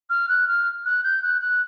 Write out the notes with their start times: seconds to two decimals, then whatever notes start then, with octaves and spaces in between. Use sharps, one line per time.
0.10 F6
0.29 F#6
0.48 F6
0.86 F#6
1.04 G6
1.23 F#6
1.41 F#6